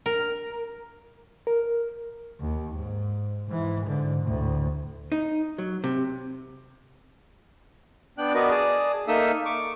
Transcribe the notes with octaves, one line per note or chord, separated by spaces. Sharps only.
A#4
A#4
D#2
G#2
G#2 E3
G#2 D3
D2 A2
D#4
F#3
C3
B3 D4 D5 G5 F#6
B3 F#4 A#4 B4 D5 D#5
G#4 D5 A5 D#6
A#3 D#4 A4 E5 D#6 E6
C#6 D6